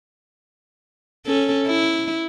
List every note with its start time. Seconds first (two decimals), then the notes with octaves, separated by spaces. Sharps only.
1.26 C#4 A4
1.66 E4